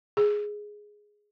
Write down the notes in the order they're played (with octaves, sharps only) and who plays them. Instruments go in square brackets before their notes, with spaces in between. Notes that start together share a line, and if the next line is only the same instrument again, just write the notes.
[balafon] G#4